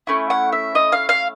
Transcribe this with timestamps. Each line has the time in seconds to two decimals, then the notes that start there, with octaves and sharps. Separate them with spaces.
0.07 A3 C#4 E4
0.30 F#5
0.52 E5
0.75 D#5
0.92 F5
1.09 F5